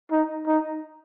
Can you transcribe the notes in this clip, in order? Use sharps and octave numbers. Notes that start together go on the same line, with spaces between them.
D#4
D#4